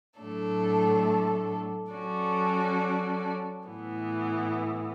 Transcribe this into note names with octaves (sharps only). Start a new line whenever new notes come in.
A2 F#3 A3 D4 A4
F#3 C#4 F#4 A4 D5
A2 E3 B3